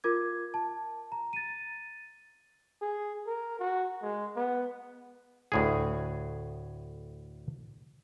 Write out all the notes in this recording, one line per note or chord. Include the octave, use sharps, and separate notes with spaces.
F4 A#4 D6 G#6
A5
A#5
A6 D#7
G#4
A#4
F#4
G#3
B3
D2 A2 G#4